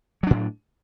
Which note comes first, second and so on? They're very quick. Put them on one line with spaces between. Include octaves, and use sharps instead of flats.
F#3 D4 A2